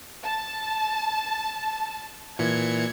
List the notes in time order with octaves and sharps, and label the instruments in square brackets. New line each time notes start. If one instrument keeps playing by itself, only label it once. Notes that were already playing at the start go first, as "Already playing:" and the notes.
[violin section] A5
[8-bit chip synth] A#2 E3 C#7 [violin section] G#6